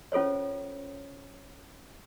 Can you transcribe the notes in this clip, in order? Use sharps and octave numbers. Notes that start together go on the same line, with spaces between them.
C#4 F4 A4 C5 C#5